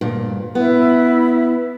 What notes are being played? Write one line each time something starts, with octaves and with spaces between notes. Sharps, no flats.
D2 G2 A#2
B3 E4